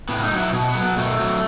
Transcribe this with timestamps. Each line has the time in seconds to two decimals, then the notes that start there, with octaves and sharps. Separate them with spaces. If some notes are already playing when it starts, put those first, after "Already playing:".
0.09 A2 B3
0.23 D#4
0.31 F#3
0.38 E4
0.53 B2
0.68 B3
0.75 F#3
0.82 B3
0.97 B2 A3
1.19 F#3